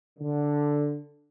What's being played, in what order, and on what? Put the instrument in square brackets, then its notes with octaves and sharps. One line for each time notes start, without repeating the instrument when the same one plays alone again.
[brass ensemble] D3